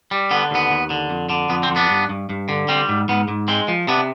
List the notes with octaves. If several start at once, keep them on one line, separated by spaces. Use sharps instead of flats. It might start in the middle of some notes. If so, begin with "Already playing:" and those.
G3
D3 B3
D#2 B3
D#2
D3
F2
D3
F2 B3
C4
F2
B3 D4
G2
G2
G2
D3
G3 C4
G#2
G#2 B3
G#2
G#3 C4
F3
C3 B3 D4